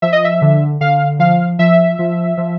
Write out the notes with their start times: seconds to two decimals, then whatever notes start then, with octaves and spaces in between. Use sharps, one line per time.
0.02 F3 E5
0.12 D#5
0.24 E5
0.42 D3
0.81 D3 F5
1.19 F3 F5
1.59 F3 E5
1.99 F3
2.37 F3